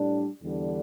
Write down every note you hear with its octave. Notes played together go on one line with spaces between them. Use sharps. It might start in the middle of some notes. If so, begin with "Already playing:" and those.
Already playing: A2 G3 D4
E2 D3 G3 D4